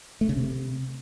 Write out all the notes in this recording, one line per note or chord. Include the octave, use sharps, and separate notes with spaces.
A3
C#3
C3